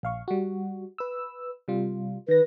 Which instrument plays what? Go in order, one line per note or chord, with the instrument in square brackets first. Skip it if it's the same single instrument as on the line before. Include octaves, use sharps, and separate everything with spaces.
[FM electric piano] A#1 F5 C#6
G3 F#4
B4 E6
C3 G3 F4
[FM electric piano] D#3 A#6 [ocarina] B4